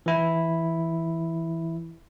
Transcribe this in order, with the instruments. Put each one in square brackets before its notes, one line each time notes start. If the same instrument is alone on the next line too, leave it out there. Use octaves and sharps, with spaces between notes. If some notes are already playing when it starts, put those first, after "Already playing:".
[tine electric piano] E3 E4